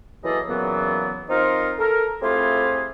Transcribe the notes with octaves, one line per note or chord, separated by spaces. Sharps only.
E3 F#3 A#3 G#4 A4 D#5
A#2 C#3 E3 F#3 B3
F3 C4 D#4 F4 A#4
A4 A#4
A3 C4 E4 F4 G4 G#4